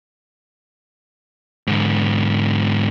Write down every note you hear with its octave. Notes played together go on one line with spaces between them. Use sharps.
G#2 D3